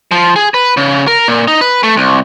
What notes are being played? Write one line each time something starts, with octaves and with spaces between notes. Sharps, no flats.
F3
G#4
B4
C#3
A#4
A#2
D#4
B4
A3
C2